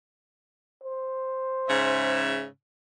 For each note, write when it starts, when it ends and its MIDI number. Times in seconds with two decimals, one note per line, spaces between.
0.84 2.33 72
1.69 2.46 44
1.69 2.46 49
1.69 2.46 76